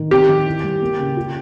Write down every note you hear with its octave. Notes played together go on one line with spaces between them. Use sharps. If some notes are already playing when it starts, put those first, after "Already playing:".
Already playing: D#3
C4 G4
D#3
E4
G3
A#3
C#3
F4